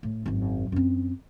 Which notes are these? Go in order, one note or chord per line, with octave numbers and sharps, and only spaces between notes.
A2
G#1 F#2
F#2 C4